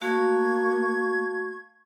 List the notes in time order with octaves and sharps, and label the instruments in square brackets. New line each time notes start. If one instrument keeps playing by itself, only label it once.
[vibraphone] A3 F#4 F5 [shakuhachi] A#3 [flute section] C#6 G#6